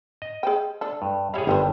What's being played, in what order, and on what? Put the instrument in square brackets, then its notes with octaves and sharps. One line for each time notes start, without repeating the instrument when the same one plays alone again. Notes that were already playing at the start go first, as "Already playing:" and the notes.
[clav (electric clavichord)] D#5
[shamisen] G#4 C5 G5
D4 A4
[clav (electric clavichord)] G2
[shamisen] G3 E4 [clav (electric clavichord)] G#4 C#5 F5
[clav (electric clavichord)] G1 G2 [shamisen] D#3 G#4 C5